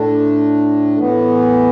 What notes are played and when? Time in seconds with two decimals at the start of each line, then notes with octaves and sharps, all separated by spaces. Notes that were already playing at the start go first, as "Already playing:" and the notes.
Already playing: A2 A3 D4
0.99 A2 E3 B3